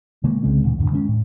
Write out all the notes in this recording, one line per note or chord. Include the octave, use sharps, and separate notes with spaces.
C3 D#3 G#3 A#3
C2 C#3 G#3 C4
D2 A#2 D#3
E2 G#2 D3
D#3 G#3 B3 C#4
A2